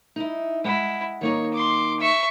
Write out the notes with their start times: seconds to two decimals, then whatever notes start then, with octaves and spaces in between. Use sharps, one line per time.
0.16 D#4 E4
0.64 G#3 E4 F#5
1.21 D#3 A#3 D#4 C#5
1.53 C6 D6
1.99 E5 C#6